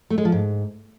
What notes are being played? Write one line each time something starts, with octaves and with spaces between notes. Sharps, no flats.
A3
G#3
F3
G#2